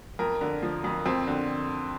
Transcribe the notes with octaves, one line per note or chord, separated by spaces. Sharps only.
F2 A#4
D3
F3
F2
F2 C4
D3